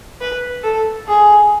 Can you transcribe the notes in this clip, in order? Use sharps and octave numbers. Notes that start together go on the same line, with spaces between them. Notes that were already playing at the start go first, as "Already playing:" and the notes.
B4
A4
G#4